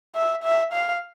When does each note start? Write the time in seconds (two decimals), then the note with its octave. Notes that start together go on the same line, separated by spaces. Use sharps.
0.16 E5
0.43 E5
0.72 F5